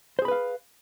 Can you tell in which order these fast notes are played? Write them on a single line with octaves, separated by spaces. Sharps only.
C5 G#4 B5 B4 F5